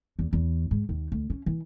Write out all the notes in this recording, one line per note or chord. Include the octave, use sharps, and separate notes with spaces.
E2
E2
G#2
D#2
D2
C#4
E3